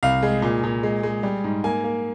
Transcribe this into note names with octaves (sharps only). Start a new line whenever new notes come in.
C2 F5
G#3
A#2
A#2
G#3
G#3
G3
G#2
A#3 G#5
A#3